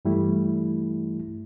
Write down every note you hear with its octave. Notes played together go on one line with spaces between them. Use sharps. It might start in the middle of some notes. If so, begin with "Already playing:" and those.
G2 E3 G3 A3 E4